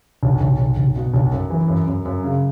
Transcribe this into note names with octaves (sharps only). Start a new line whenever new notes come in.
B1
B1
B1
B1
B2
B1
F#2
E3
F#2
F#2
F#2
C#3